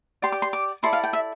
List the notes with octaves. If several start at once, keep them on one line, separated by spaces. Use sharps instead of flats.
G4 D5 C6
D6
C6
D6
E4 A4 D5 C6
F5
G5
E5